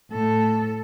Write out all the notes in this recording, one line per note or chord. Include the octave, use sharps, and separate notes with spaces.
A2 A4